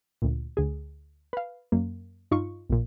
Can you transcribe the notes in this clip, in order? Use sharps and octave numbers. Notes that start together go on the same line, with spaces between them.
D2 A#2
D2 G#4
B4 F5
F#2 A#3
G2 D#4 F4 C#6
A#1 A#2